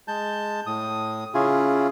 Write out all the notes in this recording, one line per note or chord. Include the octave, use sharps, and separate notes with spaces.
G#3 A5 G6
A2 D#6
C#3 C#4 E4 F4 G#4